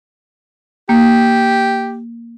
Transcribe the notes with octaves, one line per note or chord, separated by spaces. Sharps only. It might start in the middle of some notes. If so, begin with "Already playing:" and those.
A#3 G4